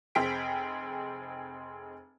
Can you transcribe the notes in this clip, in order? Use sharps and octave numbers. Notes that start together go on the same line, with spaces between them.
F1 C4 G#4 G5 B6 D7